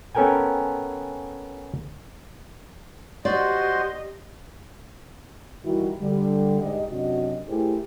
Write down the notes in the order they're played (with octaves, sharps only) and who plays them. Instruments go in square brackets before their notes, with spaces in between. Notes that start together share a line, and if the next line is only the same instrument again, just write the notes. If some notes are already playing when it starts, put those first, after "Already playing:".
[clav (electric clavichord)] B3 C#4 A4 A#4 G5 G#5
[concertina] F#4 C5 C6 [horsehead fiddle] G4 D#5 [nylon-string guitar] D5
[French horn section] D#3 E3 G3 E4 F#4
D3 G3
G#2 G4 D5 D#5
F#2 C3 D4 F#4 D#5
A3 E4 G4 G#4 A#4 C5